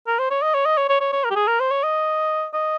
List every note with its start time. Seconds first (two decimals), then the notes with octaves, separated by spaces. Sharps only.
0.07 A#4
0.19 C5
0.31 C#5
0.42 D#5
0.55 C#5
0.66 D#5
0.78 C#5
0.89 C#5
1.01 C#5
1.13 C#5
1.24 A#4
1.31 G4
1.36 G#4
1.48 A#4
1.60 C5
1.71 C#5
1.83 D#5
2.54 D#5